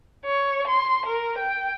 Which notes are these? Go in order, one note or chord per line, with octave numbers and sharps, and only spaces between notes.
C#5
C6
A#4
G5